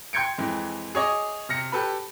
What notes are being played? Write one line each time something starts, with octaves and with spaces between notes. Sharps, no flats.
G5 C6 G6 G#6 C#7 D7
F2 E3 G#3
G#4 C#5 D#5 D6
C3 F6 A#6 C#7
G4 A4 B4 B5